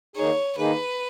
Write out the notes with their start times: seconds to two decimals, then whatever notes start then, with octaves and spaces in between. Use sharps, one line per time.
0.16 D#3 A#3 D#4 G#4 C#5
0.58 D#3 A#3 D#4 G#4 B4